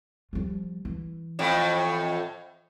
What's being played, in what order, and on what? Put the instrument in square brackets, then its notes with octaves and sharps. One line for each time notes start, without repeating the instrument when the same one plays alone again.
[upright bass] F3 G3
E3
[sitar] F2 A2